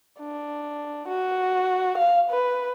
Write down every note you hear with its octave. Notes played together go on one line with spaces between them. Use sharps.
D4
F#4
F5
B4